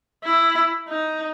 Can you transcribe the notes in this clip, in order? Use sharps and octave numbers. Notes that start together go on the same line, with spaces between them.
E4
D#4